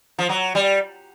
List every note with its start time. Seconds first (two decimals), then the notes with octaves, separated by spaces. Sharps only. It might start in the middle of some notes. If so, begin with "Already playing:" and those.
0.19 F3
0.29 F#3
0.55 G3